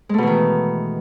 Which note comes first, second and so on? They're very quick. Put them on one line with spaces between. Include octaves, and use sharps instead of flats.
G#3 A3 B2 E3 D#3